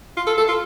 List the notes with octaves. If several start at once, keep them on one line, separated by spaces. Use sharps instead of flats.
F4
A4
A4
F4